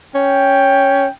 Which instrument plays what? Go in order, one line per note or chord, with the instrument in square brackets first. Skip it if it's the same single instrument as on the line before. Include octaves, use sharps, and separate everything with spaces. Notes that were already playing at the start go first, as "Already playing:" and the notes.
[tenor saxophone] C#4 [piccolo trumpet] G5